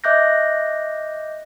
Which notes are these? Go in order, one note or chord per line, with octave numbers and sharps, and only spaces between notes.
D#5 E5 D6 F#6 G6 A#6